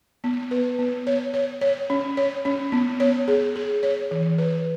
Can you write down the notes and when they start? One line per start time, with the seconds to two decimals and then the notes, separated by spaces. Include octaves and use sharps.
0.24 B3
0.51 B4
0.79 B3
1.07 C#5
1.34 C#5
1.61 C#5
1.90 C#4
2.17 C#5
2.45 C#4
2.72 B3
3.00 C#5
3.28 G#4
3.56 G#4
3.83 C#5
4.11 E3
4.38 B4